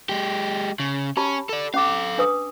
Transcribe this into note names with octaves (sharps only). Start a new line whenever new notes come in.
G#3 G4
C#3
C#4 G4 A5 B5
A4 D5
C#4 A4 F5 D6
D4 B4 D#6